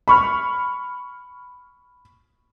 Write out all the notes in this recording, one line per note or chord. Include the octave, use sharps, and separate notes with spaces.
B5 C#6 F6